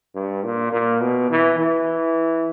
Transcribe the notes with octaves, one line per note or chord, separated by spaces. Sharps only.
G2
A#2
A#2
B2
E3
E3